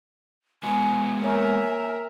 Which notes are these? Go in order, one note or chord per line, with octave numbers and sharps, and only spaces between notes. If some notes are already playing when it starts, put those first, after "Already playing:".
G#3 B3 F#4 G#5
A#3 A#4 C#5 E5